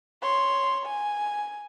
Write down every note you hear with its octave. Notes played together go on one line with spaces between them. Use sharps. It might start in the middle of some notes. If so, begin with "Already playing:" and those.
C#5 C6
G#5